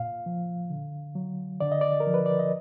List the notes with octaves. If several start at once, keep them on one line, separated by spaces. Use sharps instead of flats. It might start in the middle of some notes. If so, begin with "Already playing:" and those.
Already playing: A#2 F5
F3
D3
F#3
D3 D5
D#5
D5
A#4
F3
B4
D5
D#5